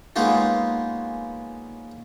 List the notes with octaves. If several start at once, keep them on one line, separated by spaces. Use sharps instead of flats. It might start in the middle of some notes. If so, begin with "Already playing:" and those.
G#3 A#3 B3 C#4 D#4 F4